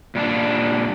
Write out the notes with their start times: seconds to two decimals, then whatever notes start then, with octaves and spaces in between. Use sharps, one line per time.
0.15 A#2 G3 D4 A5